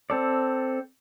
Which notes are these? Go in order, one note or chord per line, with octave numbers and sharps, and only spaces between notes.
C4 A4 D5